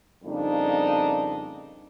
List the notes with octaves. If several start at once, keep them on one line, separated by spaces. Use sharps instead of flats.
F2 C#3 G3 A#3 D4 D#4